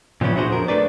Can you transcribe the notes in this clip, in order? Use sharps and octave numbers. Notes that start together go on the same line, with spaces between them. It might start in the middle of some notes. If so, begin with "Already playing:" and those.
A#2 F3 B3 C#4 E4
D4 F#4 G#4 C5
F2 A#4
A3 D4 B4 D5